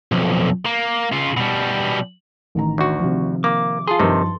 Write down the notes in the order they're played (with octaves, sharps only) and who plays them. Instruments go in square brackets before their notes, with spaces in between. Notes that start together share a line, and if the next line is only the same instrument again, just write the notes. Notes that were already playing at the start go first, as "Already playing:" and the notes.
[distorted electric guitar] B1 F2
A#3
C#3 F4
B2 G3
[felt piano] A1 D#3 A#5
[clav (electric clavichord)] D2 F#4
[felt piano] C3 D#3 F3
[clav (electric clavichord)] A#3 [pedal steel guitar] D6
[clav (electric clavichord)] F4 G#4 [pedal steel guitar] A4 C6
[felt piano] G2 F3 D#4 [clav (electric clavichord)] C3 D#3